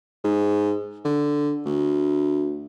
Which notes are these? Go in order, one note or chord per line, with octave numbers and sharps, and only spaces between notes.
G#2
D3
D2